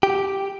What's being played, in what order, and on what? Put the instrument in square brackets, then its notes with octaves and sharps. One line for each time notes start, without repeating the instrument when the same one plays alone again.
[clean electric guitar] G4